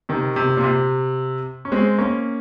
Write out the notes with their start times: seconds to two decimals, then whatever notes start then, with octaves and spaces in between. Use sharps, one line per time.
0.09 C3 D#3
0.36 C3
0.57 A#2
0.64 C3
1.65 C#4
1.72 G#3 C4
1.98 A#3 C#4